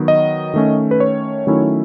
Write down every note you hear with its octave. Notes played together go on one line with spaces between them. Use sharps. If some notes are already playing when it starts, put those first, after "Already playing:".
Already playing: D#3 F#3 B3
D#5
D#3 A3 C#4
B4
C#5
D#3 F#3 A3 C#4 E4